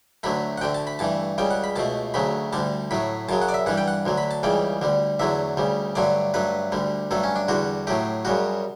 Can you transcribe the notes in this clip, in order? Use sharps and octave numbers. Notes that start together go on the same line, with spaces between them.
D2 D3 F#3 A3 B5
F#5
D2 D3 A3 G5
A5
B5
G2 E3 A3 A5
C#2 C#3 G3 G5
F#5
B5
C#2 B2 A3 A5
D2 C#3 F#3 A3 B5
D2 D3 G3 A5
A2 F#3 A3 B5
F#2 C#3 F#3 A5
F#5
D5
E5
G2 E3 G3 F#5
G5
F#5
D2 D3 F#3
B5
A5
C#2 C#3 E3 G3 G5
D2 D3 G3
E2 D3 F#3 A3 E5
D2 C#3 G3
G2 D3 F#3 A3 D5
G2 F#3 A3 B4
D2 D3 G3
G2 F#3 A3 A4
C#4
D4
E2 D3 G3 F#4
A2 F#3 A3 G4
F#2 C#3 G3 F#4